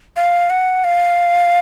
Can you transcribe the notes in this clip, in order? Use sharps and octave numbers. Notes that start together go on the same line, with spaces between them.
F5
F#5
F5